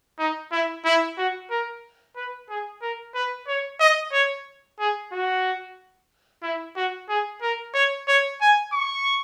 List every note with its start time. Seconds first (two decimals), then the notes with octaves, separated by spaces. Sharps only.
0.19 D#4
0.52 E4
0.85 E4
1.18 F#4
1.51 A#4
2.16 B4
2.49 G#4
2.82 A#4
3.15 B4
3.47 C#5
3.80 D#5
4.13 C#5
4.79 G#4
5.13 F#4
6.43 E4
6.76 F#4
7.09 G#4
7.42 A#4
7.74 C#5
8.08 C#5
8.41 G#5
8.73 C#6